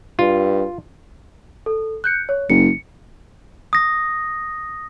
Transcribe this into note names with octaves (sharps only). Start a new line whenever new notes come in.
G2 F4
A4
F#6 G6 C#7
C#5
F#1 C#7
D#6 A#6